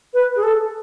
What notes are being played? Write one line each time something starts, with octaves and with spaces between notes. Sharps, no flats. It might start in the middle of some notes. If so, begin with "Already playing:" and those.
B4
G#4
A4